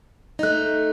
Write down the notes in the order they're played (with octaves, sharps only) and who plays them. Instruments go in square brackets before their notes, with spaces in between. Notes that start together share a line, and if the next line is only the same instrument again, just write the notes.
[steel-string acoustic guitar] A3 D#4 [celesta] D#5 F#6